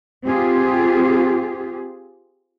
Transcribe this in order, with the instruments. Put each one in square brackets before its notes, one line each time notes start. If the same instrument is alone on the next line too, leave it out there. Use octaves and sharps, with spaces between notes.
[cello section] C4 F4 G4 G#4